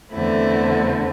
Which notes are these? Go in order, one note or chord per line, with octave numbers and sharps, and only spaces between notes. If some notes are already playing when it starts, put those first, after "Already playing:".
E2 D3 A3 C4 E4